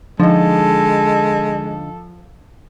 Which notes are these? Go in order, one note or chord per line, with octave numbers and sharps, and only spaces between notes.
D3 F3 G#3 D#4 A4